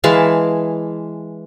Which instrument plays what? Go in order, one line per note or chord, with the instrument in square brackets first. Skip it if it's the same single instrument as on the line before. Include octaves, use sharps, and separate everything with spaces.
[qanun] E3 G#3 F5 A5